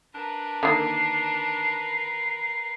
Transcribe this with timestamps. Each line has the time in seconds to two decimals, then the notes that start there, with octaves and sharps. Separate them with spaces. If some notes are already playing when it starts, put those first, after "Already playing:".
0.15 D4 A#4 B4
0.63 D3 D#3 A#3 C7